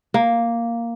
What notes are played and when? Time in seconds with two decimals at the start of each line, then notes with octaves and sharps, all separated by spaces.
0.14 A#3